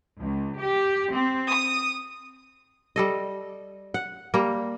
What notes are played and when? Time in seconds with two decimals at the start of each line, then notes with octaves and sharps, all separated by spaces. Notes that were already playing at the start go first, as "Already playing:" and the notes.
0.20 C#2
0.60 G4
1.12 C4
1.51 D#6
2.96 G3 A4 D#5
3.94 F#5
4.34 G3 A#3